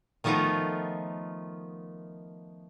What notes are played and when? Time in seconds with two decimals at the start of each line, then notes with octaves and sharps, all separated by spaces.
0.24 D#3 F3 A3 B3 D#4 F4